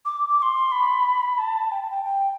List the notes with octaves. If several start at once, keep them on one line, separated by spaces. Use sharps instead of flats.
D6
D6
D6
C6
B5
A5
G5
A5
G5
G5